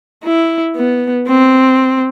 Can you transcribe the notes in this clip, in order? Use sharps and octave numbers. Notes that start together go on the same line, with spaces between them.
E4
B3
C4